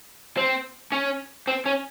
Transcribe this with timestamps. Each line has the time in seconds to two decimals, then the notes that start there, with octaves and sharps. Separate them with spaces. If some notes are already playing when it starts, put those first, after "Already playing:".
0.37 C4
0.92 C#4
1.47 C4
1.66 C#4